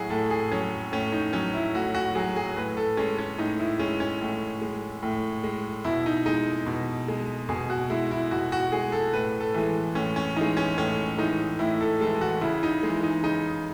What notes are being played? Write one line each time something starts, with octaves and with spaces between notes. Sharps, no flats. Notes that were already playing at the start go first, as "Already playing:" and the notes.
Already playing: A2 F#3 E4 F#4 G#4
A2 A4
G#4
F#3 C#4
A2 C#4
D#4
F#3 C#4
E4
A2 F#4
F#4
F#3 G#4
G#4
A2 B4
A4
G#3 C#4
C#4
A2 D#4
E4
G#3 C#4
C#4
A2
G#3
A2
G#3
B2 E4
D#4
G#3 D#4
B2
G#3
B2 G#4
F#4
G#3 E4
E4
B2 F#4
F#4
G#3 G#4
A4
A2 B4
A4
E3 G#3
A2 C#4
C#4
E3 G#3 D#4
C#4
A2 C#4
E3 G#3 D#4
A2 E4
A4
E3 G#3 A4
F#4
C#3 E4
D#4
E3 G#3
D#4
C#3 D#4